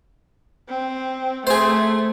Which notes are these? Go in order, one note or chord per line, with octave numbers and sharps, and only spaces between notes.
C4
A3 G#4 C5